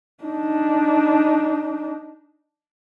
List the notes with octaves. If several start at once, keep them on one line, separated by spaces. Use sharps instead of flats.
D4 D#4